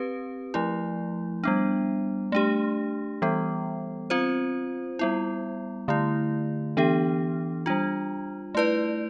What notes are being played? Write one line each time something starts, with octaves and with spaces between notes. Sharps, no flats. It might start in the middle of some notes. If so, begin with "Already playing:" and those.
Already playing: C4 G4 B4
F3 A3 E4
G3 B3 D4
A3 D4 G4
E3 G3 B3
C4 F4 C5
G3 B3 E4
D3 A3 E4
E3 B3 D4 G4
G3 D4 F4
A3 E4 B4 D5